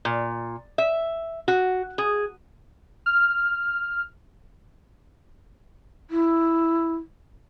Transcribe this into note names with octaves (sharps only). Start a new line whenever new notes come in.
A#2
E5
F#4
G#4
F6
E4